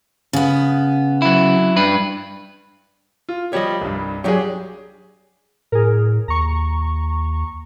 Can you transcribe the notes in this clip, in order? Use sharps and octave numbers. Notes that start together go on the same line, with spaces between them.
C#3 B3
F#3 E4
G2 D4 B4
F4
F3 G3 G4 C#5 D#5
C2 G2
F#3 D4 G4 G#4 C#5
A2 G#4 A#4
D#2 A#5 C#6